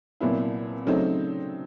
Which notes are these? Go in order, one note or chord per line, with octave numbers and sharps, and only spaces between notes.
C2 A#2 F#3 B3 E4
C#3 F#3 A3 C4 D#4